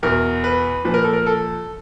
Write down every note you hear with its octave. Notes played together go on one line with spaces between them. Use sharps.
E2 B2 A#4
B4
A#2 F3 B4
A#4
A4
A#4
A4